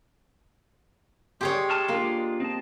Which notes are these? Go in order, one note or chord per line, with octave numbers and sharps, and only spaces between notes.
G#3 G4 G#4 C#5 C6 D6
A5 C#6 F6
A#3 D4 F4
G#3
C4 D#5 A5